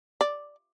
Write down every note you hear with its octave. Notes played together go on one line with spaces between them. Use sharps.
D5